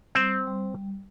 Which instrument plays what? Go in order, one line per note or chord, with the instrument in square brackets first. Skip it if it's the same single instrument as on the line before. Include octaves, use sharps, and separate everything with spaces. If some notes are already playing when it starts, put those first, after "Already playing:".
[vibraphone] G3 [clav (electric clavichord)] C4 C5
[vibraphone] G3